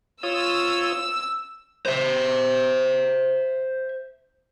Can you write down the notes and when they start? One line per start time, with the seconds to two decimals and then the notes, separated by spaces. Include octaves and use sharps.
0.23 F4 C#5 D#6 E6
1.86 C5 E5